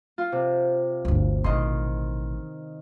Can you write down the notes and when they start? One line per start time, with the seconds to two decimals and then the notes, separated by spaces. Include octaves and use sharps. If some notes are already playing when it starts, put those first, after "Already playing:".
0.18 F4
0.32 C3
1.05 G1 D2
1.44 A1 B2 D#3 D#5 C6